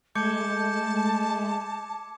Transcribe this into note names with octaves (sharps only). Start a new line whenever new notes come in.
G#3 A3 A5 D6 G6 G#6 C#7